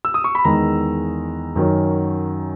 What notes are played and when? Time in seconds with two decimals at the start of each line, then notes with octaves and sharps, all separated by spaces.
0.05 E6
0.14 D#6
0.24 C#6
0.35 B5
0.45 E2 D#3 G#3 A#5
1.56 F#2 D#3 F#3 C#4